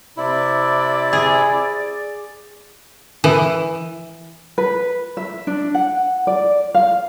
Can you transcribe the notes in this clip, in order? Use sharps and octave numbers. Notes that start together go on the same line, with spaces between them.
C3 E4 D5
G#4
E3
B4
E5
D4
F#5
D5
F5